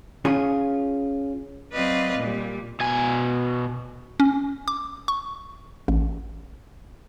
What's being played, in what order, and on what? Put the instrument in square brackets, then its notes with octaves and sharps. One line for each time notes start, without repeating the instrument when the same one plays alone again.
[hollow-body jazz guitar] C#4 F4 G#4
[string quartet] F#3 C4 B4 D5 D#5 F5
A#2 G3
[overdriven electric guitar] B2 G#5
[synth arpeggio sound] C#4
D6
C#6
A1